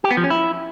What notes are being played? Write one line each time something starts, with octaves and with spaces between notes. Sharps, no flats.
G4
B3
F3
C#4
E4